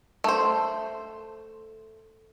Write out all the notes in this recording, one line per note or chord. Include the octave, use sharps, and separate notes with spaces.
A3 C5